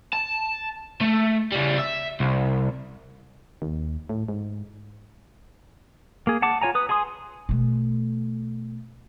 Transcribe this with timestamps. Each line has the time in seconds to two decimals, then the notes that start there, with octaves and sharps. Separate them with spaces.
0.13 A5
1.01 A3
1.52 C#3 G3
1.78 E5
2.20 C2
3.62 D#2
4.09 A2
4.28 G#2
6.27 A#3 G#4
6.42 F#5 A5 D6
6.62 F4 C#5 G#5 A#5
6.75 B4 D#6
6.89 G#4 G#5 C6 D#6
7.49 B2 A3